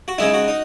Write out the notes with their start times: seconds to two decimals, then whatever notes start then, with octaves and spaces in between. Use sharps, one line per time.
0.08 F#4
0.18 C#3 G#3 D#4 E4
0.34 F#4
0.48 D#4